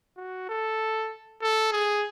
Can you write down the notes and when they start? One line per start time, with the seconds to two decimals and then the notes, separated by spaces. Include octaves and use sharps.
0.17 F#4
0.49 A4
1.42 A4
1.72 G#4